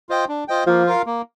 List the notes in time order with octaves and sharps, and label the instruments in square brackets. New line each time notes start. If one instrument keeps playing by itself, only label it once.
[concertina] F4 C5 D#5 G5
D4
F4 C5 D#5 G5
[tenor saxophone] F3 [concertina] A#3
[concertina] F4 A#4 F5
A#3